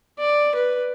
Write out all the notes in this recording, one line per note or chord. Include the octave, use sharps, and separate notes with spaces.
D5
B4